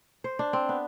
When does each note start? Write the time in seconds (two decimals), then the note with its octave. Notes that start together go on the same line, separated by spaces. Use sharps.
0.24 C5
0.39 D4
0.53 C4
0.69 B3